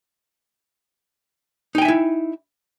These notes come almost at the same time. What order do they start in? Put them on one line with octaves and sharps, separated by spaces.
D#4 G5 G#5 E5 E4